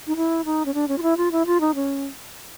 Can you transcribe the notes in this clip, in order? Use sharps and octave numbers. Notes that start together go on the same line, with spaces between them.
D#4
E4
D#4
C#4
D4
C#4
F4
E4
F4
E4
F4
D#4
C#4